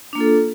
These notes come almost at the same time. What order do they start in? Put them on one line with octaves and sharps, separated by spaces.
D4 A#3 F4 A4